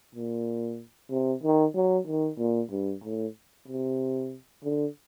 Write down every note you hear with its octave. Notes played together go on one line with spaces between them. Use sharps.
A#2
C3
D#3
F#3
D#3
A#2
G2
A2
C3
D3